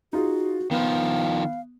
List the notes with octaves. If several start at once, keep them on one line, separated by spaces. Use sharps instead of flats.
D#4 F4 F#4 G#4
D#3 F3 B3 F5